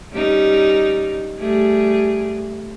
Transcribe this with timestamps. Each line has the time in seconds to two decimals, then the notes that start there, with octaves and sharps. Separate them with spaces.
0.12 G3 C#4 D#4
1.39 G3 A3 G#4